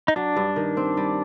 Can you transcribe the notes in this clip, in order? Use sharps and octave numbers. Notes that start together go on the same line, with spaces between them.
D#4
F#3 D4
G2
D#3
C4
G3